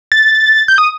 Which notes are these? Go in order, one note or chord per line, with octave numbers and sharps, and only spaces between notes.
A6
G6
D#6